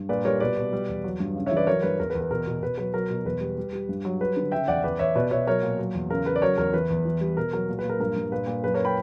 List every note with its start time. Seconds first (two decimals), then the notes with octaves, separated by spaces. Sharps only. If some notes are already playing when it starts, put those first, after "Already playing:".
Already playing: G2
0.09 A#2 B4 D5
0.25 G3 A#4 C#5
0.40 B2 B4 D5
0.57 B2
0.73 G3
0.89 E2
1.04 F#3
1.20 G2
1.36 C#3
1.46 C#5 E5
1.51 E3
1.57 B4 D5
1.67 F#3 A#4 C#5
1.83 G2 B4
1.99 E2 A#4
2.10 B4
2.15 E2
2.21 B4
2.31 B2 A#4
2.47 B2
2.62 B2 B4
2.78 F#3 B4
2.94 F#3 A#4
3.10 B2
3.25 E2 B4
3.41 G3
3.58 G3
3.73 G3
3.89 G2
4.05 F#3
4.21 G3 B4
4.37 D3
4.52 C#3 E5 G5
4.68 E2 D5 F#5
4.84 E2 B4 D5
4.99 E2 C#5 E5
5.15 B2 B4 D5
5.31 B2 C#5 E5
5.47 F#3 A#4 C#5
5.63 A#2
5.79 F#3
5.95 E2
6.10 C#3 A#4
6.26 C#3 B4
6.36 D5
6.42 F#3 A#4 C#5
6.58 E2 A#4
6.73 E3 B4
6.90 E2
7.05 E3
7.21 G3
7.37 B2 A#4
7.53 F#3 A#4
7.69 A#2
7.79 B4
7.84 A#2
7.89 A#4
8.00 G2 A#4
8.16 G2
8.32 A#2 B4
8.47 A#2
8.64 F#2 B4
8.74 A#4 C#5
8.85 G5 B5